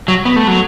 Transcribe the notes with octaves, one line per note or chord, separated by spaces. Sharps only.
F#3
B3
A3
F#3